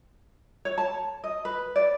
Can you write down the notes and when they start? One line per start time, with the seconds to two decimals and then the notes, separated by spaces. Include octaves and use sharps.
0.65 C#5
0.78 A5
1.24 D#5
1.45 B4
1.76 D5